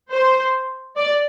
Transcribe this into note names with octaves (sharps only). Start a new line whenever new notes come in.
C5
D5